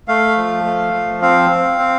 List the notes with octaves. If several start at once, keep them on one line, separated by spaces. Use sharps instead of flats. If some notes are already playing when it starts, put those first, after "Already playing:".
A3 F5
F3
A3
F3
C4 F5
C4
C4